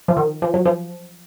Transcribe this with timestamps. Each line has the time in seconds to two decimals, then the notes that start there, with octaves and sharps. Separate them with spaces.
0.08 F3
0.17 D#3
0.42 F3
0.54 F#3
0.66 F3